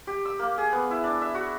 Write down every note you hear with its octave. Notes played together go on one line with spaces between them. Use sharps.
G4
E6
A#3
G#4
B3
E4
D4
E5
F#4